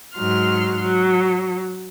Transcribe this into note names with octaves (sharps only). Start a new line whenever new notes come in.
G#2 F#3 C6 F6
F#3